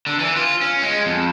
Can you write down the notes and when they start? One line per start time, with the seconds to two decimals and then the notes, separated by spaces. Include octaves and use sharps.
0.07 D3
0.19 E3
0.36 F4
0.61 C#4
0.82 G#3
1.06 F2